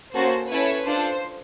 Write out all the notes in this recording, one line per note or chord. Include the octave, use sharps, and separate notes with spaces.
A#3 C#4 F#4 A4 C5
C#4 E4 A4 B4 C#5
D4 F4 A4 C5